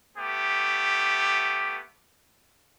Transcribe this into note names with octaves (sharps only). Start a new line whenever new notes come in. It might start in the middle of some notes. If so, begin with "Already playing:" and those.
A3 B3 G4